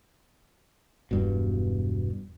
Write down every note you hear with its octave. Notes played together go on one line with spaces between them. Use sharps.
E1 G2 B2